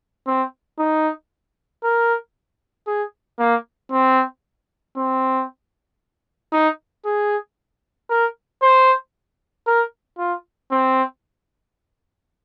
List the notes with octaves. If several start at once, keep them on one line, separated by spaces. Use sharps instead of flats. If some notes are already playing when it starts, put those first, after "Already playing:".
C4
D#4
A#4
G#4
A#3
C4
C4
D#4
G#4
A#4
C5
A#4
F4
C4